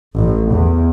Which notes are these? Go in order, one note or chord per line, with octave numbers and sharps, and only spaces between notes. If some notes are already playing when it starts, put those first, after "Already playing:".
A1
E2